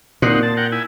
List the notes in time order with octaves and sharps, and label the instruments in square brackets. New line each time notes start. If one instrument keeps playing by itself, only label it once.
[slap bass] A#2 [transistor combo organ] C4 D#4 F#5
[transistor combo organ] A5
A#4 F#5 G5
E4 G#5